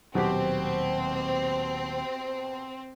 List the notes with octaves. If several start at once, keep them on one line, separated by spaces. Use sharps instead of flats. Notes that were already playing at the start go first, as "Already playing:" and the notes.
D#1 D#2 B2 F#3 C4 G4